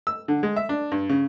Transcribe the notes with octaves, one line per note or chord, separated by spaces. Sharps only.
E6
D3
G#3
E5
D4
G2
C#3